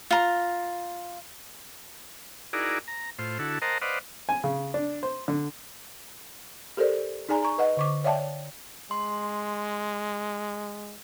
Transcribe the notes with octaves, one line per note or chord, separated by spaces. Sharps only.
F4 A#5
D#4 E4 F#4 G#4 A#4 D5
A#5
A2 F4 C5
D3 E4 F#4 A4
A#4 C5 D#5 F#5 A5 A#5
B4 C5 D5 D#5 F5 F#5
G#5
C#3
D4
C5
D3
G4 A4 A#4 C5 D5
D#4 G#4 D5 G#5 A#5
A#5 C#6
B4 D#5 F#5
D3 C#6 D6
C#5 D5 E5 F5 G5 A5
G#3 C6